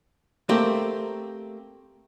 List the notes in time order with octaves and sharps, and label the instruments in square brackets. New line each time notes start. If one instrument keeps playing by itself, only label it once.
[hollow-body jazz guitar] A3 A#3 C4 G4